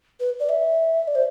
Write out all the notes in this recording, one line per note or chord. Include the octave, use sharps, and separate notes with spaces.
B4
D5
E5
D5
C5